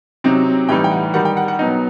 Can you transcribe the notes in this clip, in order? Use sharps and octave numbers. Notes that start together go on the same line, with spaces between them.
C3 F#3 C4 D#4
A2 E3 G3 D#4 G5
G5
F#5
D#3 G3 D#4 F#5
G5
F#5
F#5
B2 F#3 B3 D#4 D#5